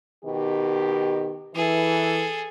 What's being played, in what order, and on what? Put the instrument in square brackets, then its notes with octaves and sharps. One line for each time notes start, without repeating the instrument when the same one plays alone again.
[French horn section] B2 D#3 G4
[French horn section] E3 [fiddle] G#4 A4